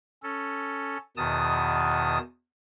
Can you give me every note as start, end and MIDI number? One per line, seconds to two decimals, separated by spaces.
0.23 0.97 61
0.23 0.97 69
1.17 2.18 40
1.17 2.18 47
1.17 2.18 51
1.17 2.18 81
1.17 2.18 87